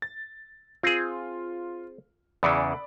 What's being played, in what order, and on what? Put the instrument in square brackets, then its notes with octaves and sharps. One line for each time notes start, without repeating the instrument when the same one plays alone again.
[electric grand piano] A6
[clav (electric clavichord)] C4 G#4 [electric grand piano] F4
[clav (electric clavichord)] E2 C#3 E3 [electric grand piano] D5 B5 D6